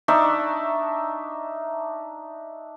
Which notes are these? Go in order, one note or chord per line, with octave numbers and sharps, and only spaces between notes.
D4 D#4 E5 C#6